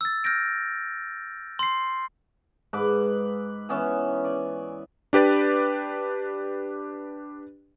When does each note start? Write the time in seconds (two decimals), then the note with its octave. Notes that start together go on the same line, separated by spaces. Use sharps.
0.01 E6 A6
0.24 F6 G6 A#6 D7
1.59 C6 C7
2.73 G#2 B4 D6
3.69 E3 B3 C#4 E5
4.24 D5 G#5
5.13 D4 G4 B4 D5